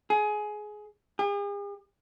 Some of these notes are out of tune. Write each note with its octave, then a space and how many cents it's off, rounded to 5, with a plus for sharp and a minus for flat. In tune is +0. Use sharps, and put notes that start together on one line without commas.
G#4 +20
G#4 -45